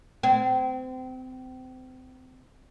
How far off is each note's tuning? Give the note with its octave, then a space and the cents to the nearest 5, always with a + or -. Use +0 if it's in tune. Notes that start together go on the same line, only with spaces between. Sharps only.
C4 -30